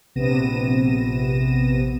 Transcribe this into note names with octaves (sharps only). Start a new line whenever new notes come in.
A#1 C3 B3 A#6 D#7 E7